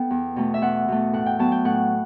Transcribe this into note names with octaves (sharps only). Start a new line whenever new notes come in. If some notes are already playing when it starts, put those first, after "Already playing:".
Already playing: B3 A4 G5
E2
B2 A3
E5
E2 F#5
B2 A3
A2 F#5
G5
F#3 B3 A5
G5
A2 F#5